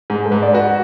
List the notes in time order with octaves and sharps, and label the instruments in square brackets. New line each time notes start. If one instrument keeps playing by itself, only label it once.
[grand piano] G#2 [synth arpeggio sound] G#4
[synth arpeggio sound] A4
[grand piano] G#2 [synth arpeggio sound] B4
[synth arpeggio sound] D5
[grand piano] F#4 [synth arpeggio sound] B4